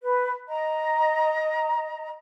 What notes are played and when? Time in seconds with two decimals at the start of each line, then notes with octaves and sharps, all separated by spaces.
0.02 B4
0.48 D#5 A#5